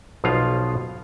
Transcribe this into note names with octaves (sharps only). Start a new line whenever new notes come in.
B1 B2 F3 F4 F5